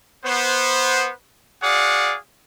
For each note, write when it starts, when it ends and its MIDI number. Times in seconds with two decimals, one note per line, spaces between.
0.24 1.11 59
0.24 1.11 72
1.62 2.15 66
1.62 2.15 68
1.62 2.15 74
1.62 2.15 77
1.62 2.15 78